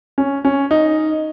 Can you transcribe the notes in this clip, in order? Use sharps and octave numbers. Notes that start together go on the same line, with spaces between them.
C#4
C#4
D#4